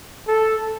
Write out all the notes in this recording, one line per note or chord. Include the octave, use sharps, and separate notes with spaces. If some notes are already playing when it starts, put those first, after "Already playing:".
A4